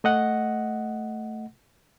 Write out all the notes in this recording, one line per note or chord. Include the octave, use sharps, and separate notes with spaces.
A3 D#5 F#5